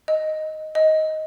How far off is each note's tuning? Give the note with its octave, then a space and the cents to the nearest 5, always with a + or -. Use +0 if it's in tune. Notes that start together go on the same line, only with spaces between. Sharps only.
D#5 +0
D#5 +10